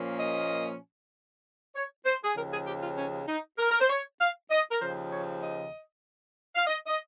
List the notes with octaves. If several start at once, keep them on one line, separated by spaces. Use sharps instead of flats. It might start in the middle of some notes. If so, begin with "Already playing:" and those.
Already playing: A#2 F3 A#3 C#4
D#5
C#5
C5
G#4
D#2 C#3 F3 A#4
G#4
G4
F4
C#4
D#4
A#4
A#4
C5
C#5
F5
D#5
A#4
D#2 C#3 F3 C5
C#5
D#5
F5
D#5
D#5